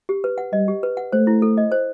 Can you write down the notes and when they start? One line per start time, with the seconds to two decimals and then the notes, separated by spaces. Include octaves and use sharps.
0.09 G4
0.24 B4
0.38 F#5
0.53 G3 D#5
0.68 G4
0.83 B4
0.97 F#5
1.12 A3 C5
1.27 E4
1.42 A4
1.57 D#5
1.72 C5